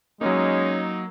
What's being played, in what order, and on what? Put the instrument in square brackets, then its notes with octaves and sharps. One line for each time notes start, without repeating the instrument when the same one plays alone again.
[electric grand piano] F#3 A#3 [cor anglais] G#3 [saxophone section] C#4 [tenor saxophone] D#4